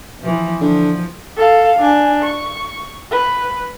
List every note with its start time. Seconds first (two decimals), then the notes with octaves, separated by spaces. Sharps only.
0.20 E3 F3
0.61 D3 F3
1.37 A4 F5
1.79 D4 G#5
2.23 C#6
3.11 B4